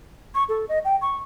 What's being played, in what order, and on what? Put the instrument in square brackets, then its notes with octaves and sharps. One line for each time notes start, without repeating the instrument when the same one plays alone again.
[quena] C#6
A4
D#5
G5
C#6